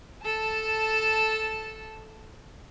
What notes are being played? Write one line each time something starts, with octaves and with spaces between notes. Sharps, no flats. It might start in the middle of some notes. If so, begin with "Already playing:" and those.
A4 A5